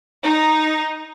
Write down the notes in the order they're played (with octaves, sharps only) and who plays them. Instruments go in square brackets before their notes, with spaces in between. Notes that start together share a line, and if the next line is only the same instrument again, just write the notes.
[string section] D#4